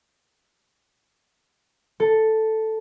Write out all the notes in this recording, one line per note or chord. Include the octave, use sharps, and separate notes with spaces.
A4